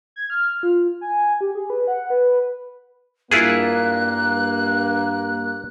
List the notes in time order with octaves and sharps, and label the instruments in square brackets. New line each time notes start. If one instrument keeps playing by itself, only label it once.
[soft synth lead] G#6
F6
F4
G#5
G4
G#4
B4
F#5
B4
[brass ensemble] G2 A#3 [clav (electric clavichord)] E4 F4 G#4 [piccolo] F#6